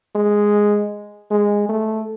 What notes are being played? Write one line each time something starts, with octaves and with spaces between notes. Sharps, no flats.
G#3
G#3
A3